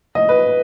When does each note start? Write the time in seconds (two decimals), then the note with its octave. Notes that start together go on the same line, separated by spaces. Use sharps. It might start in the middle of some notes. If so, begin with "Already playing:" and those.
0.15 D#5
0.29 B4